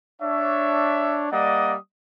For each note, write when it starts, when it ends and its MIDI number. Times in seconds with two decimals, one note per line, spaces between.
0.22 1.26 62
0.22 1.26 73
0.22 1.26 76
1.32 1.75 55
1.32 1.75 58
1.32 1.75 74
1.32 1.75 75
1.32 1.75 78
1.32 1.75 87